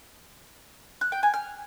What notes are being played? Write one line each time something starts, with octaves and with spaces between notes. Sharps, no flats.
F#6
G5
G#5
F6